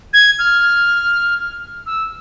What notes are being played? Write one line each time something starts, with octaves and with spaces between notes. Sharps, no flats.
G#6
F6
E6